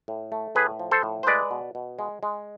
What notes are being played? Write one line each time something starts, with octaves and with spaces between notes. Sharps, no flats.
A2
A3
A2 G#4 B4
F3
A4 C5
A2
C5
G#3 B4 D5
B2
B2
G#3
G#3